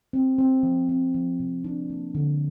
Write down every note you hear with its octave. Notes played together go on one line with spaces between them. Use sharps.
C4
C4
F3
C4
F3
C3
D4
A#3
D3